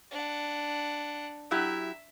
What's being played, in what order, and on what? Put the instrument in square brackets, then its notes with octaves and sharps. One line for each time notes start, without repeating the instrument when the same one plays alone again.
[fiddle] D4 F#5
[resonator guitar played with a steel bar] F#3 E4 G4 [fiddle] E5